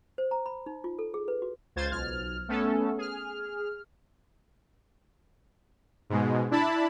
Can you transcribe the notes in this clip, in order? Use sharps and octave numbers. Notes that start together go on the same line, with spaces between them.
C5
A#5
B5
D#4
F4
A4
G#4
B4
F#4
C#2 F4 C5 G#6 A6
B1 F6
A3 B3 C#4 A4
G#4 F6
G#2 B2 G#3
D4 E4 A5 B5